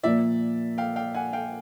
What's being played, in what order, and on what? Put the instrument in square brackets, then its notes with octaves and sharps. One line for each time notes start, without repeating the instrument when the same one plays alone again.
[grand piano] A#2 F3 A#3 [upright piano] D5 E5
[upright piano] F5 G5
F5 G5
F#5 G#5
F5 G5